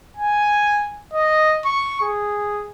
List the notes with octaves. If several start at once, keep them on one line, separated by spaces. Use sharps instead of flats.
G#5
D#5
C#6
G#4